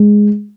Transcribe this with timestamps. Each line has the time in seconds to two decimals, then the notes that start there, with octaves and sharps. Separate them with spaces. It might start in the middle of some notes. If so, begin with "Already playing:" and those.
Already playing: G#3